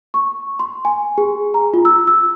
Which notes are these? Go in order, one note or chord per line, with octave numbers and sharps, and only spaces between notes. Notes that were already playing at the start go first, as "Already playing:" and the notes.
C#6
C6
G#5
G#4
A#5
F4
E6
E6